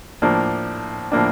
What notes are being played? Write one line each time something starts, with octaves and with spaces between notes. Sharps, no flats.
A2 F3 A#3 D4
A2 F3 A#3 D4